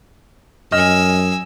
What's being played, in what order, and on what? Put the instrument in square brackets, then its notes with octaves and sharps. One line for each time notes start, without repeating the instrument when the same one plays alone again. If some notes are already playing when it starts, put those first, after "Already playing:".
[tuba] F#2 [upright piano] D#5 F6 [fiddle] G#5 E6